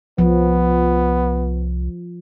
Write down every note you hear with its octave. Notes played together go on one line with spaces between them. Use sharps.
C2 F3 B3